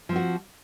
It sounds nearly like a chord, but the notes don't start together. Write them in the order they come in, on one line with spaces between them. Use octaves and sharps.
F3 C4 F#4